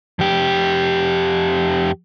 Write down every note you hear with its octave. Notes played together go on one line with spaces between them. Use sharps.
F2 G4